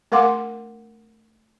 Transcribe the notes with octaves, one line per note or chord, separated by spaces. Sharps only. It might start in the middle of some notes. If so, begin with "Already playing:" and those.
A3 A#4 F5 F#5 C6 D6